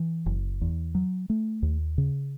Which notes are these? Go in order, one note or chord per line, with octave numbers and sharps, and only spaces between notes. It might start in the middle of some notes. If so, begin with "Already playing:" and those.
Already playing: E3
F#1
E2
F#3
A3
D#2
C#3